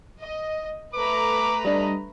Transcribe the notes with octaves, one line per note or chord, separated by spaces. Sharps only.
D#5
A3 B4 A#5 D6
G3 D4 D#5